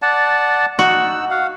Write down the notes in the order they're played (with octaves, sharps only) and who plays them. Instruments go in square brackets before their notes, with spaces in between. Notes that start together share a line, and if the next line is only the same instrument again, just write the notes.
[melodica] D5 F#5 A5
[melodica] D#4 E6 [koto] F#4
[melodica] F5 F#5